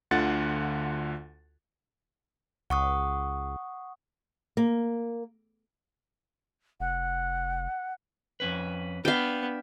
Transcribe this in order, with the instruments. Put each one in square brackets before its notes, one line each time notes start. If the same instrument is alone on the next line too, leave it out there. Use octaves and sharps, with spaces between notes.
[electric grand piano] D2 D3 F4 F#5 A6
[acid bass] C#2 [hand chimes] F#5 C#6 D#6
[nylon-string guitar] A#3
[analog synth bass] F1 [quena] F#5
[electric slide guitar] F2 C#4 B4
[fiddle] B3 [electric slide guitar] D4 B4 [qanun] F5 G5